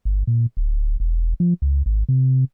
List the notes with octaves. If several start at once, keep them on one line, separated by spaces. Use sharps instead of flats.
G1
A#2
D1
E1
F3
C#2
G#1
C3